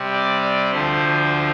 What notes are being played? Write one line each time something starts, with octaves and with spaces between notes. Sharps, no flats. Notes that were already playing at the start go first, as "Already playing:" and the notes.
Already playing: C3 G3 C4
D5
D5
D2 D3 F3 C5